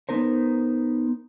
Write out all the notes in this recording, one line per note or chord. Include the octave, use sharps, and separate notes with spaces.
B3 D#4 A#4 C5